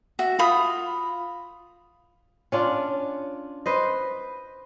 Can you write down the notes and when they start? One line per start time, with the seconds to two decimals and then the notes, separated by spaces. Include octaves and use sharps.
0.19 F#4 E5
0.39 F4 B5 D#6
2.52 C#4 D4 F4
3.66 B4 C5 D#5